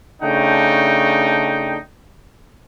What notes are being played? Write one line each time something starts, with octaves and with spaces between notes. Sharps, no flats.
C#3 A3 D4 D#4 G5